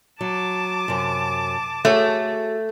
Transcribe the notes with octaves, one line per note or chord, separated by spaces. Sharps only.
F#3 A5 D6
F#2 C3
A3 F#4 G#4 C#5